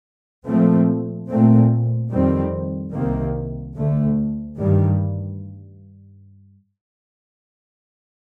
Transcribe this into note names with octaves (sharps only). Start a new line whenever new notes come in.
A#2 F3 A3 C4
A#2 A3 C4
F2 D#3 G3 C4
C2 C3 D#3 A#3
D2 D3 A3
G2 D#3 G3